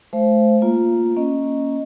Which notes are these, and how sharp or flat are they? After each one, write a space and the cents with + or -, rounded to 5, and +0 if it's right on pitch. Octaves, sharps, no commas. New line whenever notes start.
A3 -35 C5 +0 F5 -40
A#3 +0 F4 +0
A#3 +5 C#4 +0 D#5 +0